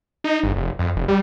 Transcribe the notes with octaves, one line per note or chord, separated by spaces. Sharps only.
D#4
G1
F1
F2
F1
G3